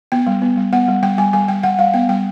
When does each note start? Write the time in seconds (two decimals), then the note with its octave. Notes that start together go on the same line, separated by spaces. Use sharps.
0.12 B3 G5
0.27 G3
0.42 B3
0.57 G3
0.72 B3 F#5
0.88 G3
1.03 G3 G5
1.18 G3 G#5
1.33 G3 G#5
1.48 G3 G5
1.63 G3 F#5
1.78 G3 F5
1.94 B3 G5
2.09 G3 G5